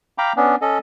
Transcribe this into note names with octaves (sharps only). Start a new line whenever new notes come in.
F5 G5 A#5 B5 D6
B3 C#4 D4
C#4 A4 D#5